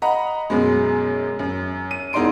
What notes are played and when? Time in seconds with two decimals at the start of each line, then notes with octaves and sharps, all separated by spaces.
0.02 D#5 F#5 A#5 B5
0.50 F#2 B2 G#3
1.39 F#2
1.91 D#7
2.13 E1 D#4 D5 C6 D7